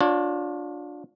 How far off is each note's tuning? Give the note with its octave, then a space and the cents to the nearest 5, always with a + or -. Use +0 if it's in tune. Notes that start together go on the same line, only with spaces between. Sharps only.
D4 +0 F4 +30 C#5 +0